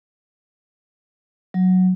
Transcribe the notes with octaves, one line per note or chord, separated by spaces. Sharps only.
F#3